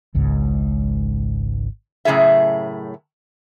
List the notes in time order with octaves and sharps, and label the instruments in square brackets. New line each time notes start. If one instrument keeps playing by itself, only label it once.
[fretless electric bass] G#1 C#2 G#2
[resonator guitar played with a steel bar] F#2 A2 C#3 G#4 E5